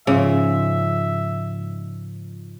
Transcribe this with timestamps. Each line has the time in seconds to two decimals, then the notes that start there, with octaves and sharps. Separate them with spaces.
0.07 G#2 C#3 F3 E5